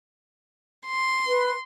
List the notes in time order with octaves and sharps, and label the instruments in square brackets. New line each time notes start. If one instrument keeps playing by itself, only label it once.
[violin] C6
[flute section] B4